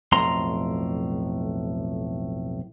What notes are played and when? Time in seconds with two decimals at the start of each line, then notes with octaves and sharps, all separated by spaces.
0.12 B1 F2 A2 A#5 C6